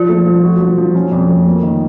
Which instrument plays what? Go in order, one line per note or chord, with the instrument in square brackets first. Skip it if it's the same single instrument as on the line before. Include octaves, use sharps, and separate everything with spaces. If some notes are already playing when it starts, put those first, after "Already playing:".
Already playing: [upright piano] F3 [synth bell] F4
[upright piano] A3
F3
F#4
F3
F3
C#4
F2
A3
A#3
D#3